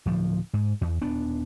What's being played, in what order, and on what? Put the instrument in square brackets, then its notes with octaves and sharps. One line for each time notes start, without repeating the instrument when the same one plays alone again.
[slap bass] D1 F3
G#2
E2
D#1 B3 D4